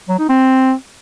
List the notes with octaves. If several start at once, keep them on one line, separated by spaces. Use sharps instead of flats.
F#3
D#4
C4